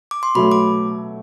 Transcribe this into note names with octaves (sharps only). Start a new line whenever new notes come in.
D6
C6
B2 F#3 A3 B5
D6